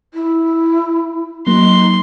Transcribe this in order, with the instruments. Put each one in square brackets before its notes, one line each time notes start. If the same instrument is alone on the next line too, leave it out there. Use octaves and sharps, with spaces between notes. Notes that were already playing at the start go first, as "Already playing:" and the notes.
[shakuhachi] E4
[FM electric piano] F#3 A#3 [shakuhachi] D#4 [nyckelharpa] C6